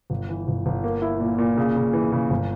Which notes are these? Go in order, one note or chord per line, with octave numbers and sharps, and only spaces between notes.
G1
E3
G1
G1
A#3
E4
A#2
A#2
C#3
C#3
E3
C#3
G1